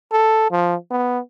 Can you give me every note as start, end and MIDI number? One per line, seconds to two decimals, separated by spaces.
0.12 0.51 69
0.51 0.75 53
0.90 1.19 59